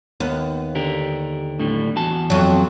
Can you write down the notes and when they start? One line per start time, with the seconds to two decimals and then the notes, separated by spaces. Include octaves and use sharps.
0.20 D#2 B3
0.75 D3 G4 A#4
1.60 A2 D3 G3
1.96 E2 F#4 A5
2.30 F2 F#3